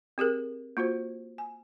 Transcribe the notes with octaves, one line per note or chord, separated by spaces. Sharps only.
C4 G4 G#4 A#4
A#3 F4 F#4 C5
G#5